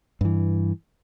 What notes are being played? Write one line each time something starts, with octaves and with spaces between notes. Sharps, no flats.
G2 E3